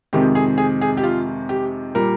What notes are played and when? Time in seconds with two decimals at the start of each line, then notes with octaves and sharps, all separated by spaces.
0.13 F2 C3 D#3 G#3 G4
0.35 G#4
0.58 G#4
0.81 G#4
0.97 G4
1.03 F4
1.49 G4
1.95 A#2 G3 A#4